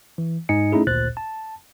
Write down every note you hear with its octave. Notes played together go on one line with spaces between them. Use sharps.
E3
G#2 D#4 D#5 G#5 C#7
A3 C#4 D#4 E4 G#4
G#1 D2 A#2 C5 F#6 A6
A5